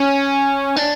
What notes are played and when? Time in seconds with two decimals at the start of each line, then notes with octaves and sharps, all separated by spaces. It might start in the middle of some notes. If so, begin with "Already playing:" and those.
Already playing: C#4
0.76 D4